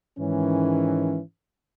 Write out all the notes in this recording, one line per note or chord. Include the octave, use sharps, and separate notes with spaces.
G#2 D#3 E3 C#4